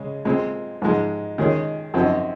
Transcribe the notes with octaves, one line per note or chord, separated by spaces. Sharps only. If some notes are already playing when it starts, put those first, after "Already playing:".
Already playing: C#3 G#3
A#2 G#3 C4
G#2 F3 G#3
D#3 G#3 C#4 G#4
F#2 F3 C4 D#4